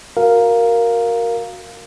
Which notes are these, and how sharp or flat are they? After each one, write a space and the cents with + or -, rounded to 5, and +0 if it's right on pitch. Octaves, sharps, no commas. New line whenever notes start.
F#4 -10 A#4 +0 F5 +0